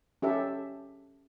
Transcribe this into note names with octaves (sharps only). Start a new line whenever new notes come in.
C#4 G4 A4 E5